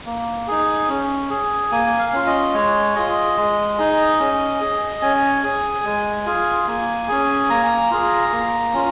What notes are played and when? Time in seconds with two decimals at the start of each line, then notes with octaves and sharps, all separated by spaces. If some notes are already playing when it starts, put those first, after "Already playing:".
0.06 A#3
0.48 D#4 G#4
0.89 C#4
1.30 G#4
1.72 A#3 G#5
1.99 F5
2.12 C#4 F4
2.26 D#5
2.54 G#3 C#5
2.96 F4 G#4 D#5
3.37 G#3
3.78 D#4 G#4
4.19 C#4
4.60 G#4
5.02 C#4 G#5
5.43 G#4
5.85 G#3
6.26 F4 G#4
6.67 A#3
7.08 C#4 G#4
7.50 A#3 A#5
7.91 F4 G#4
8.32 A#3
8.73 C#4 F4